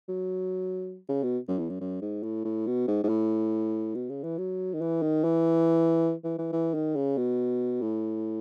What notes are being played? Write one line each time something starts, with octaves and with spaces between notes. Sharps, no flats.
F#3
C#3
B2
F#2
E2
F#2
F#2
G#2
A2
A2
B2
G#2
G#2
A2
B2
C#3
E3
F#3
D#3
E3
D#3
E3
E3
E3
E3
D#3
C#3
B2
A2